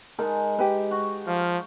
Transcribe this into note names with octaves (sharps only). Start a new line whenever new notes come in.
G#3 D#4 A#4 A5
G4 B4
F#4
F3 F5